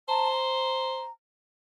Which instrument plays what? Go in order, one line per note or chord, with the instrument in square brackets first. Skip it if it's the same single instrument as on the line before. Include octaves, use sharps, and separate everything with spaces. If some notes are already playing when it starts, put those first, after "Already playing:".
[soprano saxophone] C5 [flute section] A5 A#5
[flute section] A#5